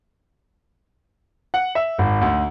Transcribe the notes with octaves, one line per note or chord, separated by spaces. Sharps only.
F#5
E5
G#1
D2